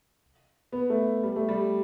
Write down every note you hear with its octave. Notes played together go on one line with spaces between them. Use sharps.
B3
A3
G3
A3
G3